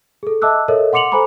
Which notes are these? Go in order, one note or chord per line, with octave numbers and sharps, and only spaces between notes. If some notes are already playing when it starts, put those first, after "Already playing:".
G#4 A4
D#5 E5 A5 D6 E6 F#6
A4 A#4 C#5 D#5 E5
F#5 C6 D6 C#7 F7 F#7
A4 C5 G#5 A#5 B5 D6